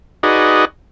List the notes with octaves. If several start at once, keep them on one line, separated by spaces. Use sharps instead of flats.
D#4 F#4 G#4 B4 D5 D#5